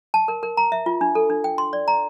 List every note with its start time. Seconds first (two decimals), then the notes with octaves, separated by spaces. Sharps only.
0.14 A5
0.28 A#4
0.43 A#4
0.57 A#5
0.72 E5
0.86 F4
1.01 D4
1.15 A4
1.30 D4
1.44 G5
1.58 C6
1.73 D5
1.88 A#5